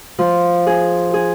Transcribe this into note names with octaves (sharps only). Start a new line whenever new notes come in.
F3
G#4
G#4